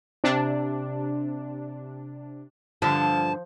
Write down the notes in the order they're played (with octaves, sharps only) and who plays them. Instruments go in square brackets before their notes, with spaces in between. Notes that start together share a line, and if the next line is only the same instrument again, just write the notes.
[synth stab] C3 D4
[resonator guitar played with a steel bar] G2 D3 [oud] F3 [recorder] A5